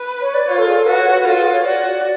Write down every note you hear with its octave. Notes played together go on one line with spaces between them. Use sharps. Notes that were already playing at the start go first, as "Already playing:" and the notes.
Already playing: B4
C#5
D5
F4 C#5
A4
G#4
A4
F#4 B4
C#5
B4
F4 A4
G#4
B4
C#5
F#4 D5
D5